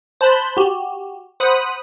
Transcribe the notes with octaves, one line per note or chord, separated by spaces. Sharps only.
C5 A5 B5 F#6 G6
F#4 G4
C5 F#5 B5 D#6 F#6